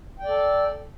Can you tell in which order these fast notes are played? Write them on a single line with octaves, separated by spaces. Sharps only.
G5 D5 A4